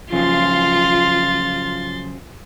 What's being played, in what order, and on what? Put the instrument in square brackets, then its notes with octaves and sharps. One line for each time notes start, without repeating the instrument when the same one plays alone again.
[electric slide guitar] C#3 F3 F#3 [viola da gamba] F4 [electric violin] C6 A6